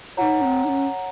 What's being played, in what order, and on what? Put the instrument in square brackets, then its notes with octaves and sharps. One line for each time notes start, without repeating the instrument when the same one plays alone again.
[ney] D#4 F4 [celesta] C#5 F#5 A#5
[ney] C#4
C4
D#4
C#4